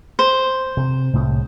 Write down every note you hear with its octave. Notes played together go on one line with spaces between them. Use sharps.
C5
C3
C2 A2 G#3